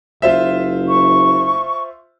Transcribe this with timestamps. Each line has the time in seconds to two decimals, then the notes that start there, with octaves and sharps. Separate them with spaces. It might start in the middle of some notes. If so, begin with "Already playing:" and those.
0.22 F#1 F4 C5 E5
0.88 C#6